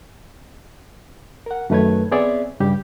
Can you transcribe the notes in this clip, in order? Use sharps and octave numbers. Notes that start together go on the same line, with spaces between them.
A#4 F#5
F#2 D#3 A3 B4 C#5 G#6
B3 C4 G#4 C#5 D5 E5
G2 C#3 G3 G4